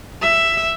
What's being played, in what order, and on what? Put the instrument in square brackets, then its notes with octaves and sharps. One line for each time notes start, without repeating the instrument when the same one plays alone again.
[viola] E5